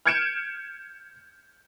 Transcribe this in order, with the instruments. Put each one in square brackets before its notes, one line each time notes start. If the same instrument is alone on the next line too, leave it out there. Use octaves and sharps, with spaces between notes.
[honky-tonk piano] F6 G6 G#6 C#7 D7 E7